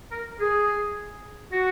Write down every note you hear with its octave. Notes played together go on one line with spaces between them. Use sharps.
A#4
G#4
F#4